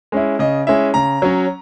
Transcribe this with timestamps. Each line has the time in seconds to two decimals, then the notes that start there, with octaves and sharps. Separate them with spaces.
0.12 G#3 C#4 E4
0.39 C#3 D#5
0.67 G#3 C#4 E4 E5
0.94 C#3 A#5
1.22 F#3 C#4